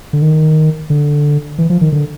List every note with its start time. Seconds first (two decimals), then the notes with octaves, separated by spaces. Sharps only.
0.13 D3
0.22 D#3
0.90 D3
1.58 E3
1.70 F3
1.81 D#3
1.92 D3